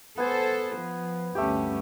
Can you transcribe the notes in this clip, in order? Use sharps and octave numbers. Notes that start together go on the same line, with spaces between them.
B3 A4 C5 G#5
F3
D2 G2 A3 C#4 G4